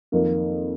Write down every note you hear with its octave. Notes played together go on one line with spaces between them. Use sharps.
F2 D#3 A#3